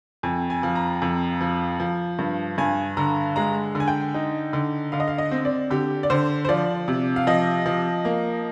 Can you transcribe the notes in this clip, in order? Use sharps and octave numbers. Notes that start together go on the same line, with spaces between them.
F2 G#5
G#5
F3
A#5
F2
F3
F3
G2
G2 G#5
D3 A#5
G#3 A#5
D3
G#5
G5
D#4
D3
D3 F5
D#5
F5
D#5
C4
D5
D3 G4
D5
D3 C5
C5
F3 D5
C3
F5
F3 D#5
F3
A#3